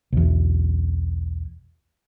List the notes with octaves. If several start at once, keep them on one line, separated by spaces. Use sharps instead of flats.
B1 E2